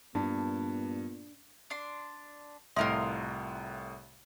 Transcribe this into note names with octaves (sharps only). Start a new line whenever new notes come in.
G2 A#2 B3 D4
D4 C6
C2 A2 F4 A#4 D#5 E5 C6